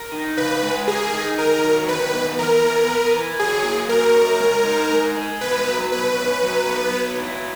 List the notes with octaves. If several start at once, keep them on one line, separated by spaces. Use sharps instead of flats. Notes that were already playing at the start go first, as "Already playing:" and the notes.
Already playing: A#4
D#4
C#3 B4
G#3
G#4 A#4
D#4
D#3 A#4
F#3
D#3 B4
B3
E3 A#4
B3
B4
E4
F#3 G#4
A#3
F#4 A#4
C#4
G#3
D#4
G#3
G#4
B2 B4
F#3
B2 B4
C#4
F#3
B3
F#3
E4